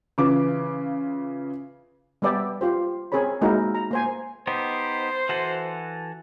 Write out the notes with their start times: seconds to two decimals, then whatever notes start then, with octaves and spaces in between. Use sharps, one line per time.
0.18 C#3 E3 F4 D6
2.22 G3 B3 B4 D5 E5 G5
2.61 F4 G4 C5
3.12 C4 G#4 A#4 C#5 B5
3.41 G#3 A#3 D#4 E4 F#4 A#4
3.75 A#5
3.91 A#3 C5 G#5
4.47 B3 D#4 G4 C5
5.29 E3 F#4 A4